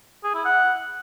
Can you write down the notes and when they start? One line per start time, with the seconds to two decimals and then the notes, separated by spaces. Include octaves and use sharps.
0.24 G#4
0.34 E4
0.45 F#5